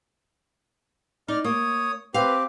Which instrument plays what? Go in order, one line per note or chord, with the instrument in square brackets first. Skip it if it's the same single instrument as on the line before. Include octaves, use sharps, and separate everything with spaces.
[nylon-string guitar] D#4 [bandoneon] D5 F6
[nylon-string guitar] A#3 [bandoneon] C#5 D#6
[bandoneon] C4 G4 [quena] B4 [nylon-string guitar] F5